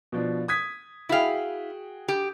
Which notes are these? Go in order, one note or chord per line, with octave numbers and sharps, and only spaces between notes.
B2 F3 D4
D#6 G#6 B6
E4 F#4 G#4 F5 G5
G4